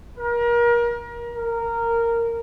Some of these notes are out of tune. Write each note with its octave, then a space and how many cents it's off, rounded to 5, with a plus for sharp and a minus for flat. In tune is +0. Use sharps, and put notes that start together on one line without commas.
A#4 +30
A#4 -10